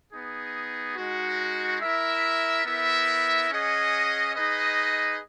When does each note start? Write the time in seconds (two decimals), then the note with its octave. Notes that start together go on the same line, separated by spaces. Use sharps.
0.11 B3 D#4 G#4
0.97 G#3 D#4 F#4
1.81 E4 A#4 E5
2.65 B3 E4 A#4 E5
3.50 C#4 G#4 D#5 F#5
4.35 D#4 G#4 B4 D#5